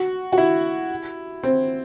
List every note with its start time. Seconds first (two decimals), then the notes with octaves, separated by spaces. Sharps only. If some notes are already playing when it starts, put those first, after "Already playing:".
Already playing: F#4
0.33 F#4
0.38 E4
1.44 C4